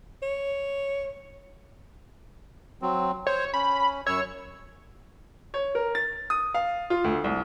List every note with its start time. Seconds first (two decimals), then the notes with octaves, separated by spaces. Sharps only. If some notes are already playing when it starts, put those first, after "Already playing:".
0.23 C#5
2.82 F#3 C4
3.27 C5 C#5
3.54 C#4 B5
4.06 F#2 C#5 E6
5.54 C#5
5.75 A#4
5.95 A6
6.30 D#6
6.54 F5
6.90 F4
7.04 D2
7.24 C2